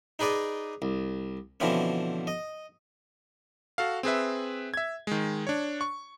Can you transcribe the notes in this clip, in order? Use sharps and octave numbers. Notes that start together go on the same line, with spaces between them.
D#4 G#4 B4 D5 D#5
C2
B2 D3 E3 F3 C4 C#4
D#5
F#4 A4 F5
C4 G#4 B4 E5
E5 G#6
D#3 G#3
D4 C#5
C#6